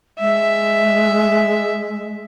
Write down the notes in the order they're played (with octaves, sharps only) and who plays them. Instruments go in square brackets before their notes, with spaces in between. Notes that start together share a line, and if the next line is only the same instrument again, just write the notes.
[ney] G#3 [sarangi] E5